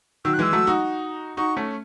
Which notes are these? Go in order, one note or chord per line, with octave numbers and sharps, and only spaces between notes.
D#3 F#3 E6
F#6
E3 G#3 E6
F#3 A3
D#4 F#4
D#4 F#4 C#6
A3 C#4